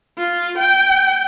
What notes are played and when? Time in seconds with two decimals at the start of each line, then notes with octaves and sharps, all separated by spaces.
0.18 F4
0.58 G5